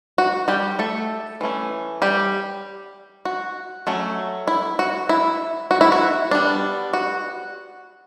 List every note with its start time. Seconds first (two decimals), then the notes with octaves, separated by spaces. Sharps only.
0.18 F#4
0.48 G3 G4
0.79 A3 A4
1.41 E3 A3 C#4
2.02 G3 G4
3.25 F#4
3.87 F#3 A3 C#4
4.47 E4
4.79 F#4
5.09 E4
5.71 F#4
5.81 E4
5.92 F#4
6.31 G3 B3 D4
6.93 F#4